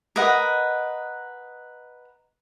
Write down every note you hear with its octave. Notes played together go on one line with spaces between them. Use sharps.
A#4 B4 D#5 F#5